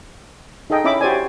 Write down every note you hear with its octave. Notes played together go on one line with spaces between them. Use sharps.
D#4 G#4 A4 D#5 G5
C#4 E4 E5 B5 D6
F#4 G4 C5 D5 G#5